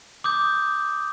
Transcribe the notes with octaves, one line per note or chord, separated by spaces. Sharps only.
D6 D#6 G6